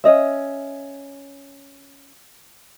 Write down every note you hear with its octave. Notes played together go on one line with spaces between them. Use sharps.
C#4 D#5 E5